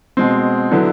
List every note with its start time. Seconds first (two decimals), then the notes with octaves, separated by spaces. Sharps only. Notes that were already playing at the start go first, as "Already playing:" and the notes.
0.17 B2 G#3 C4
0.71 D3 F#3 B3 E4